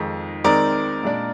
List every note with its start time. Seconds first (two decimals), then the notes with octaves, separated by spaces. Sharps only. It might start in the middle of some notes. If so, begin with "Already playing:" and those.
Already playing: F2 D#3 G#3 D#4
0.44 D#3 G#3 C4 D#4 A#4 D5
1.03 A#2 G#3 D4